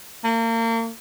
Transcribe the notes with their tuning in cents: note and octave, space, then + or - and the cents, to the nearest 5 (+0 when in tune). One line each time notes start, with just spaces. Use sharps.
A#3 -35